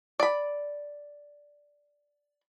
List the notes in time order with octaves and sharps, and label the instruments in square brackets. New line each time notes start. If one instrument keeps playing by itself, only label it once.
[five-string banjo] D5 B5